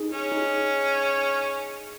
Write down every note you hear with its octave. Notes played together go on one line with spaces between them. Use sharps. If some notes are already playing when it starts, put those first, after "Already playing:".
Already playing: D#4 G#4
C#4
D#4 G#4